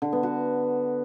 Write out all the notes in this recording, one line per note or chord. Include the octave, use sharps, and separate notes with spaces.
D3
B3
F#4